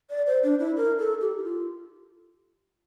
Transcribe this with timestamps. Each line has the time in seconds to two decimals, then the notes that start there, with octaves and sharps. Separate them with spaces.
0.10 D5
0.27 C5
0.43 D4
0.59 E4
0.77 A#4
0.99 A4
1.21 G4
1.38 E4
1.44 F4